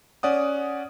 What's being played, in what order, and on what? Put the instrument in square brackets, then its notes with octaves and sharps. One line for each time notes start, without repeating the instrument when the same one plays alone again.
[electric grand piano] C#4 D5 F#5 D#6